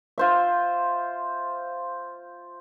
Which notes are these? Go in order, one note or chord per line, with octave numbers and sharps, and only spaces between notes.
F4 C5 E5